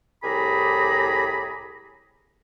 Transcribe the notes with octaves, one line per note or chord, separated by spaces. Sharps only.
C2 A2 G4 G#4 A#5 B5